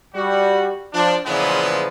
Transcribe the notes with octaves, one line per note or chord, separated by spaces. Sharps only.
G3 F#4
F3 D4
A#2 C#3 E3 F3 G#3 B3